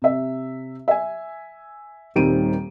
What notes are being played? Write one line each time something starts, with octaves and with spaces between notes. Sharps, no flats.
C3 E5
E5 G#5
D#1 D#3 G3 C4 D7 D#7